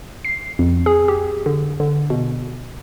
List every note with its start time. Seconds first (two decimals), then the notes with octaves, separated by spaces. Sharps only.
0.25 C7
0.59 F2
0.86 G#4
1.08 G4
1.46 D3
1.80 D3
2.10 B2